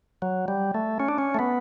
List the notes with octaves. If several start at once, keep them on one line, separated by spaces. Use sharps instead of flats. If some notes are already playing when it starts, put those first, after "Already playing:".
F#3
G3
A3
C#4
D4
C#4
A3
B3